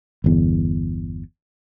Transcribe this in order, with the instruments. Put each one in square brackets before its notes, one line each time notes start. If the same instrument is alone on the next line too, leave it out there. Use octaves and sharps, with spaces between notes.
[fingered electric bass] G1 E2